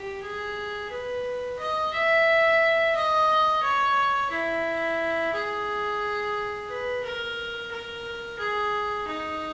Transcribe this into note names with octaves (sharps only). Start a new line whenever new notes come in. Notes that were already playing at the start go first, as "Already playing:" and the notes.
Already playing: G4
G#4
B4
D#5
E5
D#5
C#5
E4
G#4
B4
A#4
A#4
G#4
D#4